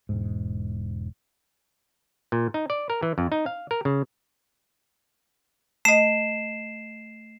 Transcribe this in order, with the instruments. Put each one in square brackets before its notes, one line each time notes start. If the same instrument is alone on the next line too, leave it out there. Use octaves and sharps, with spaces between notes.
[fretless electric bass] E1 G#2
[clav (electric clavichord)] A#2
D#4
D5
A#4
E3
F2
D#4
F5
A#4
C#3
[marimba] A3 D#5 [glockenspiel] C7 E7